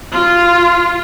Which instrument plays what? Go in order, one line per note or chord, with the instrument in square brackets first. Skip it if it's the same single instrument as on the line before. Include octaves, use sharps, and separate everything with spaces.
[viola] F4